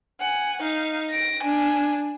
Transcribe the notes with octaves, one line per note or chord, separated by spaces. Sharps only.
F#5 G#5
D#4 F5
A#6 D7
D4 G#5